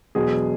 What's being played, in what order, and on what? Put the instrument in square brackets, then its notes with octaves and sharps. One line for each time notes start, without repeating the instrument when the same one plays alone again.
[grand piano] E1 E2 B2 F#3 G#4